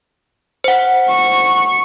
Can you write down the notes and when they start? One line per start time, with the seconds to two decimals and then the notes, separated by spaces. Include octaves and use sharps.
0.64 C5 F#5
1.10 C#6